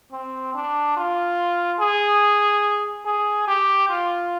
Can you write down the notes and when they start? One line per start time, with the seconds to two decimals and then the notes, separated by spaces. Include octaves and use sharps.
0.12 C4
0.54 D4
0.97 F4
1.80 G#4
3.05 G#4
3.47 G4
3.89 F4